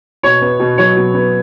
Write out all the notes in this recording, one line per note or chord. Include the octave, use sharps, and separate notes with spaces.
B2 C#5
B3
B2
F#3 C#5
B2
B3